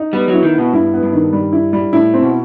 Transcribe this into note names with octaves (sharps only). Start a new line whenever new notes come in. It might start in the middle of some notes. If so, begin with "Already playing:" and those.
Already playing: D#4
G3 B3
F#3
E4
D#3
B2 B3
G2 E4
B3
G2
D#3
G3
E4
G3
A2 E4
C4
B2